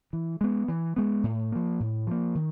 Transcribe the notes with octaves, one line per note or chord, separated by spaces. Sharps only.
E3
G#3 B3
E3
G#3 B3
A2
F3 A#3
A2
F3 A#3
D#3